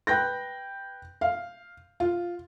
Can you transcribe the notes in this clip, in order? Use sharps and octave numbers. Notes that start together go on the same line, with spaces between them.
B4 G5 G6 A#6
F5
F4